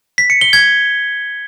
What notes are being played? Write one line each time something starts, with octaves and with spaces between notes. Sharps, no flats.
B6
C#7
G7
G#6